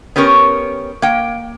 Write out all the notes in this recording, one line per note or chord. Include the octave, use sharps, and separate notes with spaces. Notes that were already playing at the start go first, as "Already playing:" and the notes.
B3 C#4 G4 A#4 C#5
A#3 G5